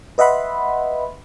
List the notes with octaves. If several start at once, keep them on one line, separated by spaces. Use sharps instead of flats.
B4 D#5 E5 F#5 B5 C6